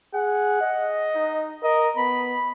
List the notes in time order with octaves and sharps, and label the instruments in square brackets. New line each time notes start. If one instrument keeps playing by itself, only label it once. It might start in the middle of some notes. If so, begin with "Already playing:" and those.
[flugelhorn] G#4 [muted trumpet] F#5
[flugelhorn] D#5
[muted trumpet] D#4
[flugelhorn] A#4 [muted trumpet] D#5
[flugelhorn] B3 [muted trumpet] B5